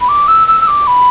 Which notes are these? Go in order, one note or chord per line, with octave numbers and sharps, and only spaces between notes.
B5
D6
E6
E6
E6
D6
B5